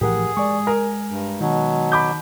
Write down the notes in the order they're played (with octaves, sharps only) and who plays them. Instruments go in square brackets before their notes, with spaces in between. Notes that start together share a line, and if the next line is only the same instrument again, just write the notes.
[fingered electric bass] A2 E3 F3 [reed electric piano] G4 A#4 F#5 [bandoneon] G#4
[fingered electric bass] G#3 [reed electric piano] D5 G#5 C#6
[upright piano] A#4 [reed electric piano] G#5
[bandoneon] G2
[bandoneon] B2 F#3 [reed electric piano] D#3 D#4
[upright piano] B5 D6 G6